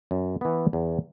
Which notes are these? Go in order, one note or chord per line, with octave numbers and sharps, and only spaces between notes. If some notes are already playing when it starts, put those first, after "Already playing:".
F#2
E3 B3
E2